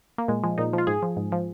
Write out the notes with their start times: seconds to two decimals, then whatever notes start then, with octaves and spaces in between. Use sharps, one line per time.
0.18 A#3
0.28 A#2 G#3
0.44 F3 G#3
0.58 A#2 D#4
0.73 F3 F4
0.87 G#2 G#4
1.02 F3
1.17 G#2
1.32 F3